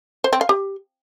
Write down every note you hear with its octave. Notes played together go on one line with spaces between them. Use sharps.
C5
C4
F5
G4